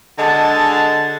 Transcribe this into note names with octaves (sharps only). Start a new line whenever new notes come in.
D3 G#3 F#4 A5